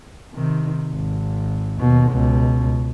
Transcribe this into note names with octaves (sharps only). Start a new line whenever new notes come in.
C3 D#3
G#1
D#2 B2
C#2 B2